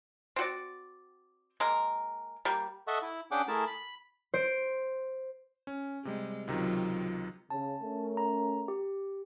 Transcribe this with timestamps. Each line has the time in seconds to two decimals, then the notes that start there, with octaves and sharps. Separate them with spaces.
0.36 C4 F#4 D5
1.60 G#3 A#3 A#4
2.45 G3 A#3
2.87 A4 D#5 E5 F#5 C#6
3.02 E4
3.31 C#4 D4 G#4 F#5 G5 D6
3.48 A3 E4 G#4 A#4 A5
3.67 B5
4.34 C5 D7
5.67 C#4
6.05 C3 G3 G#3
6.47 C#2 C3 D#3 F#3 F4
7.50 C#3 A5
7.81 A3 C#4 A#4
8.17 A#5
8.68 G4